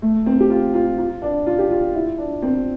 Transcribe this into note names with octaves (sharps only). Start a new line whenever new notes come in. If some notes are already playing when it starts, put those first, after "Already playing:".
A3
C4
G4
F4
F4
F4
D4
F4
G4
F4
E4
D4
C4